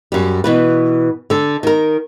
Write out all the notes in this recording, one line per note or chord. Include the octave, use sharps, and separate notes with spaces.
F#2 G3
B2 E3 B4
D3 A4
D#3 A#4